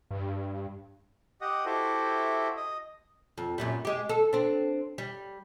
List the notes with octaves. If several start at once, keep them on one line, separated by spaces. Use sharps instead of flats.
G2
G4 D#5 F#5 D#6
E4 F#4 G4 A4 C5 E5
D#5 D#6
F2
F#2 A#2 G3
G#3 G4
A4
C4 D4
G3